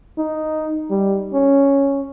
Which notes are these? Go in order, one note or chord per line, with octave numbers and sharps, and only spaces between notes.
D#4
G3
C#4